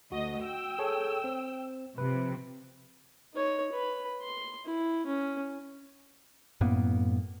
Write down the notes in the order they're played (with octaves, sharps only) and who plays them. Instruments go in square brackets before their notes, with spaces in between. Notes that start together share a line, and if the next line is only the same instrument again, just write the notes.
[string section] D2 D#5 [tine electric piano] F#4
[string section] G5 E6
[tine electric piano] G#4 A4 C#5
C4
[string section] C3 F3 [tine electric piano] B4
[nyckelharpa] D#4 C#5
B4 B5
C6
E4
C#4
[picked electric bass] F#2 A2 A#3 B3